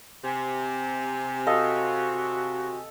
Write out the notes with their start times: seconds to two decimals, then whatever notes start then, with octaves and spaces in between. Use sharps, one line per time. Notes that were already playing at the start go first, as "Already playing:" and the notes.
0.24 C3 G#5
1.47 F#4 A4 D#5 F5